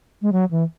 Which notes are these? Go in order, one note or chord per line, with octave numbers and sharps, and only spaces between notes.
G#3
F#3
E3